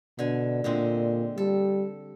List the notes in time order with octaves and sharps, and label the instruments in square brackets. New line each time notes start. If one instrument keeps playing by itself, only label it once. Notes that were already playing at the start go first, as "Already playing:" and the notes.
[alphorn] B2 [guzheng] D3 G#5
[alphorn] A#2 [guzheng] D3 G#3 C4
[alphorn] G3 [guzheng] A4